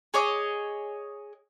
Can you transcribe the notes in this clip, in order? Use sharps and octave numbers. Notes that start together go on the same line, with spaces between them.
G#4 C#5 D#5 D6